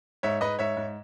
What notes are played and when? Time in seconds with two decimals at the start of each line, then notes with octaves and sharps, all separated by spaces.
0.23 G#2 C#5 E5
0.41 G#2 B4 D#5
0.59 G#2 C#5 E5
0.77 G#2